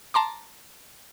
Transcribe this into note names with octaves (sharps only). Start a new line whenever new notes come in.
A5 A#5 C6 D6